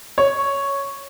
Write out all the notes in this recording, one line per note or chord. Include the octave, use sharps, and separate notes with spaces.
C#5